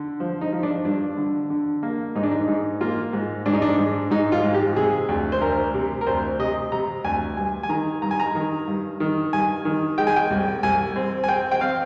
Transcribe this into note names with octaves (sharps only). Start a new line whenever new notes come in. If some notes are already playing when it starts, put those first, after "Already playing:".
Already playing: D3
F3
D#4
F3
D4
G2 D4
D3
D3
A#3
G#2 D#4
D4
D#4
G#2
A#3 F4
G#2
G#2 D4
D#4
D4
G#2
G#2 D#4
F4
G#2
G4
C3 G#4
D2
C5
D2 A#4
C3
A#4
D2 C5
C3 D#5
C3 A#5
D2 G#5
G2 G#5
G#5
D#3 A#5
G2 A#5
G#5
A#5
D#3
G2
D#3
G2 G#5
D#3
G#3 G5
G#5
G5
C2
C2 G#5
C4
G#5
C4 G5
G5
C4 F5